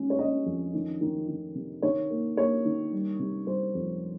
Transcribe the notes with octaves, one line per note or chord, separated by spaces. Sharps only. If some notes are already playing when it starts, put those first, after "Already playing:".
Already playing: D#3 G#3 C#4
C#5
C#4 D#5
F2
D#3
D#3
D#3
C3
D#3 C#5
A#3
A#3 C#5
D#3
G3
C3
G3 C5
F2